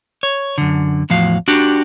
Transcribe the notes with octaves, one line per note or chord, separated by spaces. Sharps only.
C#5
F#2 D3
E2 A2 F3 F#4 F5
D4 F#4 G4